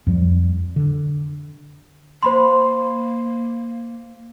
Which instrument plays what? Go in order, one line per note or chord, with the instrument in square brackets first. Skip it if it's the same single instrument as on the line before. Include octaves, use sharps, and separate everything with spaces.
[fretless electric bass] F2 F3 G3
D3
[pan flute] A#3 [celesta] C5 B5 C6